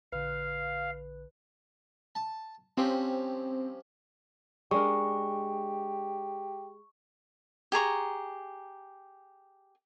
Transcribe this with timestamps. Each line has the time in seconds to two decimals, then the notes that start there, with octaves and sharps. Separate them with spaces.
0.12 A#1 D3 B4 F5
2.15 A5
2.77 F3 G3 C4 C#4
4.71 G#3 D4 G4 A#4 C#6
7.72 G4 G#4 A#5 C#6